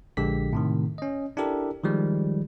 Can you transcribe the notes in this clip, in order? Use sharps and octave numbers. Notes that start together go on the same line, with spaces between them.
A#1 D3 G#3 G4 B6
A2 C3 D#3
C#4 D#5
D4 E4 G4 A4 A#4
D#3 F3 G3 G#3